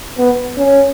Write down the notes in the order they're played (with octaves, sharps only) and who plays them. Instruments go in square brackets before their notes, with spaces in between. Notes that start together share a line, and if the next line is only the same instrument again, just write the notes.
[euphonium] B3
C#4